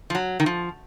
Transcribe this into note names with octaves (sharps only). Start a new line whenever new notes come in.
F3
F#3
D#3
F3